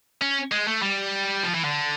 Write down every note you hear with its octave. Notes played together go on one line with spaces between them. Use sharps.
C#4
G#3
A3
G3
F3
E3
D3